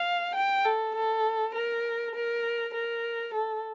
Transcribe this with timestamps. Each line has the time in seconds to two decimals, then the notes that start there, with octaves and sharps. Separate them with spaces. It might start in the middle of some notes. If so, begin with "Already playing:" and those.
Already playing: F5
0.35 G5
0.65 A4
0.95 A4
1.55 A#4
2.15 A#4
2.74 A#4
3.34 A4